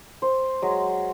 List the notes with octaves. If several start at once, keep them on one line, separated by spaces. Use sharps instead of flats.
C5
F#3 G#3